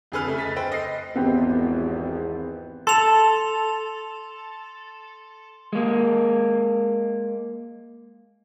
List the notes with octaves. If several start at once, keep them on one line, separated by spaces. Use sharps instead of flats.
F2 D3 G#4 A4 B4 F6
C#3 A3
D#5 A6 B6
A4 B4 C5 G5
D#5 C7
G#1 E2 B3 C4 G4
A4 C6 F7
G#3 A#3